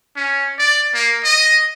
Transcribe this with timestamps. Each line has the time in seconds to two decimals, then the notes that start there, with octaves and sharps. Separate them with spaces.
0.16 C#4
0.59 D5
0.94 A#3
1.24 D#5